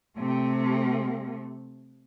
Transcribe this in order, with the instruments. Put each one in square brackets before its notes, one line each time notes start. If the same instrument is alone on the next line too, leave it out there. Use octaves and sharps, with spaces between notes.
[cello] C3 A3